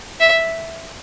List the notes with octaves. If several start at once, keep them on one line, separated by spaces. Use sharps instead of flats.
E5